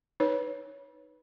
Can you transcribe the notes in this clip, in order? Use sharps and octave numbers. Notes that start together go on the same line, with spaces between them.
D#4 B4 C#5